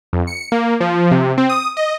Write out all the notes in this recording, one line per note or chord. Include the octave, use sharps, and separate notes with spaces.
F2
C#7
A#3
F3
C3
C4
D#6
D#5